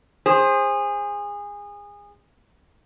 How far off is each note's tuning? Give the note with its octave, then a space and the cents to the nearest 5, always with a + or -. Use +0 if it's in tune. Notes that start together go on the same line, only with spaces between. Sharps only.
G#4 -25 C5 +20